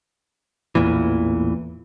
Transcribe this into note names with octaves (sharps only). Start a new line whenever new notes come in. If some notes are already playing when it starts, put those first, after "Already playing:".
A1 E2 A#2 E3